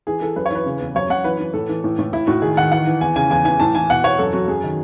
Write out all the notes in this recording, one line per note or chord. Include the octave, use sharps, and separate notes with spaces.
E3 G#4
E3 A4
F#2 B4
C#5
E3 B4
C#3
E2
F#2 C#5
F#2 F#5
E3 B4
E3
A2 A4
E3
A2
A2
A2 E4
A2 F#4
D#3 G#4
D#3 F#5
E3 F#5
E3
E2 G#5
C#3 G#5
E2 G#5
E3 G#5
A2 A5
E3 G#5
B2 F#5
E2 C#5
F#2 A4
F#2 F#4
F#2 G#4
D#3